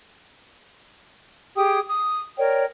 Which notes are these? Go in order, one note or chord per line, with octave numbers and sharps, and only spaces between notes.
G4 G#4 G5 D#6
D#6
A#4 C#5 D5 G5